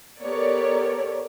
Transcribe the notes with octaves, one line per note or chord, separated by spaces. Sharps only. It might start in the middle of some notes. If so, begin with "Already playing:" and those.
B3 G4 A4 A#4 C#5 D5